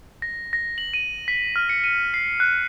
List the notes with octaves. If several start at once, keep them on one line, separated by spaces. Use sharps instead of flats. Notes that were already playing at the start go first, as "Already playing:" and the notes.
A#6
A#6
F#7
D#7
B6
F6
C#7
D#7
C7
F#6